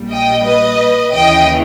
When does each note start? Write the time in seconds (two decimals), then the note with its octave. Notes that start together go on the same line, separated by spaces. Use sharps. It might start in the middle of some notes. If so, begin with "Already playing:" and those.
Already playing: A#1 A#2 G3
0.09 D#5 G5
0.44 B4 D#5
1.12 D#2 C#3 E3 D#5 G5